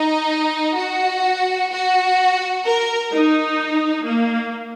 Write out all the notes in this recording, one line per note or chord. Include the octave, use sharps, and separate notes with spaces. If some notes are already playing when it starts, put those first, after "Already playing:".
Already playing: D#4
F#4
F#4
A#4
D#4
A#3